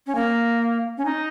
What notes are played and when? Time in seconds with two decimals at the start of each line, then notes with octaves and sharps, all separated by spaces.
0.07 C#4
0.15 A#3
0.98 C#4
1.05 D#4